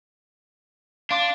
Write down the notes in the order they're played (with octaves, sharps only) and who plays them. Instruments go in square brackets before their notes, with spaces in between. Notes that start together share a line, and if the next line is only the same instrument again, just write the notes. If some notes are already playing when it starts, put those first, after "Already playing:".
[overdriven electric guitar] D4 [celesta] F5 C6 D6